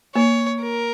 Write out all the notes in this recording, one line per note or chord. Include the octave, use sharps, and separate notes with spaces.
A#3 C#5
A#4